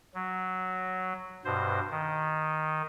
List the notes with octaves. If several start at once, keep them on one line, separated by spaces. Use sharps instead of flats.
F#3
G2 B2 C5
D#3